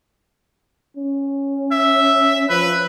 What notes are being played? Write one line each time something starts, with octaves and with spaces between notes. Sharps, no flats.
C#4
E5
F3 B4